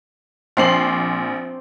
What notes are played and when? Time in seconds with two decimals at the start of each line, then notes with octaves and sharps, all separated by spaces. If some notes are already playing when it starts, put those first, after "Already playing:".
0.57 A#1 C4 C6 D6 C7 F#7